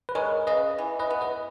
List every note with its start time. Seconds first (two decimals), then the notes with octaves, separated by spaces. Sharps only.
0.09 B4
0.15 G#3 A#4 C#5
0.47 C#3 B4 D#5
0.78 E3
1.00 B4 D#5
1.10 B3
1.21 B4 D#5